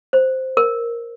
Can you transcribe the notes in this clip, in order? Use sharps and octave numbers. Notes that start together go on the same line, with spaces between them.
C5
A#4